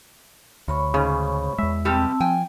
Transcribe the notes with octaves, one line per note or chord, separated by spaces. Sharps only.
D2 C#5 B5 C#6
G#2 C#3
E2 G#3 E5
B2 G3 C4 G4 A5 E6
F3 G5 G#5